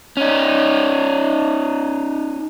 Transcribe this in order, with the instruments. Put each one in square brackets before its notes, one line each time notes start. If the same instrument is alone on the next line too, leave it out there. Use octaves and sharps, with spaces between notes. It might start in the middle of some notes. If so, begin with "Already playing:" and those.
[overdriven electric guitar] C#4 D#4